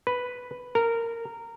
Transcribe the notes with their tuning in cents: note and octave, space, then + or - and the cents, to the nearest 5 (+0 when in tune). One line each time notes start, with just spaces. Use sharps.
B4 +0
A#4 -15